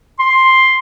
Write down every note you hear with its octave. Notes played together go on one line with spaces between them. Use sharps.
C6